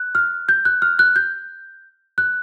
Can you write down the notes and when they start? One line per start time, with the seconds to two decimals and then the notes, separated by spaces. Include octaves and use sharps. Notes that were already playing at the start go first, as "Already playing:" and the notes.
Already playing: F#6
0.15 F6
0.49 G6
0.65 F#6
0.82 F6
0.99 F#6
1.16 G6
2.18 F#6